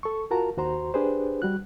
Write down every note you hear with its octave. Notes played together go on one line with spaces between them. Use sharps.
A4 C#6
F4 F#4 A#4 A5 A#5
D#2 F#4 C5 A#5 C6
D4 G4 G#4 B4 C5
G3 F#4 F#6